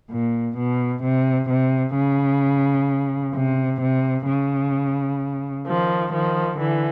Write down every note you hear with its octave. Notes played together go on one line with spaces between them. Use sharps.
A#2
B2
C3
C3
C#3
C3
C3
C#3
D#3 F3
D#3 F3
D3 E3